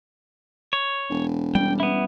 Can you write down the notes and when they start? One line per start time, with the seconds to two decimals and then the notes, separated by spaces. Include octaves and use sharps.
0.73 C#5
1.10 E1
1.55 G3 C#4 G5
1.80 B3 E4